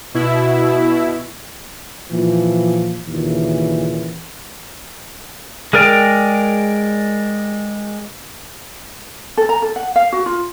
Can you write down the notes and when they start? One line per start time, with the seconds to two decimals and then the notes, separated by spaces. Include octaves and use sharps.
0.14 B2 E4
2.12 A#2 E3 F3
3.06 D#2 A#2 C#3 E3
5.73 G#3 G#4 A#4 D5 G5
9.37 A4
9.49 A#5
9.62 A4
9.76 F#5
9.96 F5
10.12 F#4
10.26 F4